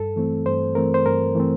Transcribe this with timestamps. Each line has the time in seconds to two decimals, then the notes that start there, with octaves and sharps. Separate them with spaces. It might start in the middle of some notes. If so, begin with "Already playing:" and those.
Already playing: G2 A4
0.16 E3 A3 C4
0.46 G2 C5
0.75 E3 A3 C4 A#4
0.94 C5
1.06 G2 A#4
1.35 E3 A3 C4